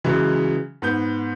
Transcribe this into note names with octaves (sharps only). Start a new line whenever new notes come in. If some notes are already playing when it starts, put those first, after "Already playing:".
C#3 E3 F#3 G#3
G#2 B3 G6